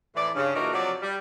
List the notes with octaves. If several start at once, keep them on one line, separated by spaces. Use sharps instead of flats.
F2 A2 E3 D5
G2 C#3
A#2 E3 D4 D#4 F#4 A#4
C3 F3 F#3 F#4 D5
G3